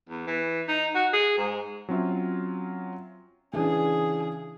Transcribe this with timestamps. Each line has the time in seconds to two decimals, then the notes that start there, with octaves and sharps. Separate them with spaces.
0.09 E2
0.27 E3
0.68 D#4
0.95 F#4
1.13 G#4
1.37 G#2
1.89 F#3 C4 C#4 F4 C#5 E5
3.53 C#3 E3 D4 G#4